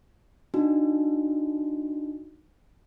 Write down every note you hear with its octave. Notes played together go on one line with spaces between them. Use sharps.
D4 D#4 F#4